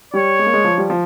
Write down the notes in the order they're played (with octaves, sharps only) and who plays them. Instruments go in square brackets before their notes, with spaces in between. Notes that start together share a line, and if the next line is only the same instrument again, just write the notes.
[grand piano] G3 [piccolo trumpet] C#5
[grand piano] G#3
A#3
G#3
F3
G3
F3